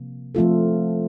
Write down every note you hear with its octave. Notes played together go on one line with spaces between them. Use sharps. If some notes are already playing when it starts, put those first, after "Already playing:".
Already playing: C3 F3 A#3
F3 A3 C4 F4 A4